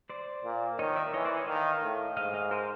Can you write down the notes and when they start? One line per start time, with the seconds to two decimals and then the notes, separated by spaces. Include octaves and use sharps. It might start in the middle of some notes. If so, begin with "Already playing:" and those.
0.10 C5 D5
0.45 A#2
0.79 D#3 C#5 D#5
0.96 D5 E5
1.14 E3 C#5 D#5
1.25 C5 D5
1.36 C#5 D#5
1.47 D#3 D#5 F5
1.83 A2
2.17 G#2 D#5 F5
2.34 D#5 F5
2.51 A#4 C5